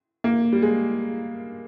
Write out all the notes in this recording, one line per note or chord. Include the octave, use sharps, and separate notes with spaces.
A#3
G3
G#3